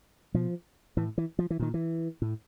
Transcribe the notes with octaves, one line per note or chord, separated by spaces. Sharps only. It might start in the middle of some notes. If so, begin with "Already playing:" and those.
B2 F3
A2 E3
E3
F3
E3
A#2 D#3
E3
A2